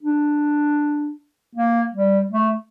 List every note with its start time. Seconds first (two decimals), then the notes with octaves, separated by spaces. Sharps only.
0.03 D4
1.55 A#3
1.94 G3
2.31 A3